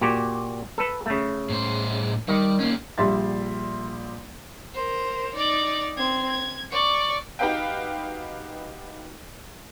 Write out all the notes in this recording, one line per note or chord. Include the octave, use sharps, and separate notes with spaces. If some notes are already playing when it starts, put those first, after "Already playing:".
A#2 F#4 G4
A4 B4
C#3 A3
A2 C5
D#3 G3
A#3 C#4
A#1 G3 E5 C6 A6
A#4 C5
D#4 D5
C4 G#6
G#6
D5 C#6
D#4 F#4 G4 B4 F5 G5